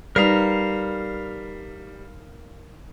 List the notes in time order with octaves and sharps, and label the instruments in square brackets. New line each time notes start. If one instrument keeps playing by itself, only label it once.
[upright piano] G3 [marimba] D#4 B4 [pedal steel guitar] A#4 F5 A#5